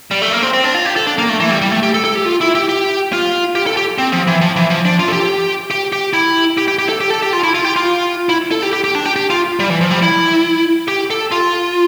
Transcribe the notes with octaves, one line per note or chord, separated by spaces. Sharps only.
G3
A3
A#3
C4
C4
D4
F4
G4
A4
D4
A#3
A3
E3
G3
G3
A3
G4
A4
A4
G4
F4
E4
G4
G4
F4
G4
A4
G4
C4
F3
E3
F3
E3
F3
D4
F4
A4
G4
G4
G4
E4
G4
G4
G4
A4
G4
A4
G4
F4
E4
F4
G4
F4
E4
A4
G4
G4
G4
D4
G4
G4
F4
G3
E3
F3
G3
E4
G4
A4
F4